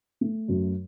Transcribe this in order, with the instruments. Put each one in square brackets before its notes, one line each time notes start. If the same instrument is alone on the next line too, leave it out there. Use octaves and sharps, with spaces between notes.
[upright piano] A3
F#2